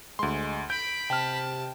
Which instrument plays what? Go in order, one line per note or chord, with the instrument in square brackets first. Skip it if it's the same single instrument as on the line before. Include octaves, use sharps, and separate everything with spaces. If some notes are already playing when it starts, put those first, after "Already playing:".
[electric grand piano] D2 C6 [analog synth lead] G#3
[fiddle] B5 [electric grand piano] G6 [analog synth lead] D7
[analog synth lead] C3 [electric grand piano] G5 F6 [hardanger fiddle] A5